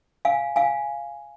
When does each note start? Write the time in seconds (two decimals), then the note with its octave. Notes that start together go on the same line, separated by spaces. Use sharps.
0.25 F5 G#5
0.56 F5 G#5